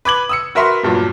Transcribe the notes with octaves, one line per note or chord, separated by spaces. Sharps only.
B4 D6 G#6 F#7
D#6 E6 C#7
F#4 A#4 B4 E5 C6 C#6
E2 G2 A#2 F3 F#3